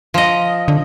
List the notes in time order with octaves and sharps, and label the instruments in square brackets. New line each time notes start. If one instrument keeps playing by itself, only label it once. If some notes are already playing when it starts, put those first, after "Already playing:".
[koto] F3 D#5
[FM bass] D3